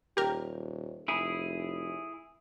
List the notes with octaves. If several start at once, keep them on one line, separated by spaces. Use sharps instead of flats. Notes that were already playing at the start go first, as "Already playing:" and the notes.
D#1 G4 A#4
F1 E4 G#4